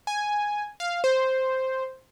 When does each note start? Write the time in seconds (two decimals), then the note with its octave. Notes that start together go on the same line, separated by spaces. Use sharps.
0.07 G#5
0.80 F5
1.04 C5